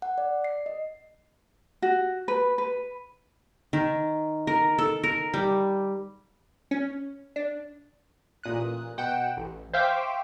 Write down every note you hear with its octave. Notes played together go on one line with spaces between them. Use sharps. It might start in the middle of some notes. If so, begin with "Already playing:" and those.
F#5
D5
C7
D#5
F#4
B4
B4
D#3
A#4
A4
A#4
G3
C#4
D4
A1 A#2 D#6 F#6
B2 F#5 G5 G6 E7
A1
C5 E5 F5 G5 C#6 D6